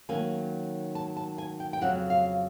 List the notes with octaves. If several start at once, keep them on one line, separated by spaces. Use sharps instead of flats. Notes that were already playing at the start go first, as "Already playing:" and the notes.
D#3 F#3 A#3 C#4 G#5
A5
A5
G#5
G5
G5
F2 C#3 F#3 F#5
F5